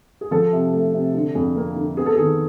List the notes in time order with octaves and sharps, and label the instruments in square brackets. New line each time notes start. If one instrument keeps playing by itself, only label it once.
[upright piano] G#4
F3 A4
C3
A3
C3
D3
F2
A#3
D3
B3 G#4
A4
D#3 G#4